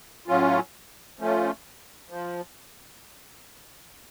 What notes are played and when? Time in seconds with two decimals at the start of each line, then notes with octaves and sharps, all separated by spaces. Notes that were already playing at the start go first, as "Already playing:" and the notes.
0.28 A2 F#3 C#4 F4
1.19 F3 A3 C#4 F4
2.09 F3